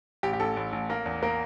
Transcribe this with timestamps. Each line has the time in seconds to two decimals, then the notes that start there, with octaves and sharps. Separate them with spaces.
0.23 A1 G4
0.33 G4
0.40 A1 A4
0.57 A1
0.73 A1
0.90 A#3
1.06 E2
1.22 A#3 A#4